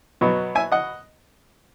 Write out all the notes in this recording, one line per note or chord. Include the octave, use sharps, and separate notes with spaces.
B2 F#3 B3
E5 G#5
D#5 F#5